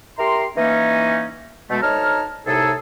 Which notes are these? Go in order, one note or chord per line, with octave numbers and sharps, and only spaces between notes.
E4 G4 A#4 A#5 C6
E3 A#3 C#4 D#4
B2 G#3 A3
D2 D#4 C#5 A5 A#5 F6
C2 A2 C3 D#4 G#4 A4